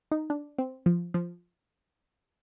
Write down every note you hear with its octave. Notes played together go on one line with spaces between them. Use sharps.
D#4
D4
C4
F3
F3